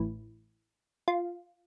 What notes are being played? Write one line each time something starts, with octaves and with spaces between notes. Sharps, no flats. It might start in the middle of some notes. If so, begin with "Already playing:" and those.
Already playing: A1 A2 E3
F4